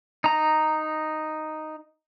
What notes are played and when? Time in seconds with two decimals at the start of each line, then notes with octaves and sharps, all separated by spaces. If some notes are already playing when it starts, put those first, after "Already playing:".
0.24 D#4 A#5